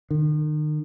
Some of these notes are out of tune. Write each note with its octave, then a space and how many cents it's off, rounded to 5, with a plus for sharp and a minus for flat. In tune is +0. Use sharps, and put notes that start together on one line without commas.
D#3 -40